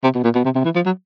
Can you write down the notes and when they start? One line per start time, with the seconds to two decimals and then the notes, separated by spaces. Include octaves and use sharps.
0.03 C3
0.15 B2
0.24 A#2
0.35 B2
0.45 C3
0.55 C3
0.64 E3
0.75 F3
0.86 F#3